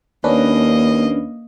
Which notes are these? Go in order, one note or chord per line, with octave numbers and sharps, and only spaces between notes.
D#2 A#3 C#4 D4 B4 D#5